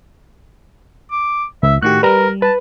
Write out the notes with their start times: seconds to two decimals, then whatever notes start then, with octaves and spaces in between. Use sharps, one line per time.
1.12 D6
1.63 C#2 E5
1.83 A2 D#3 F#4 G4 F#6
2.03 G3 A#4 B4 A#5
2.42 B4 A5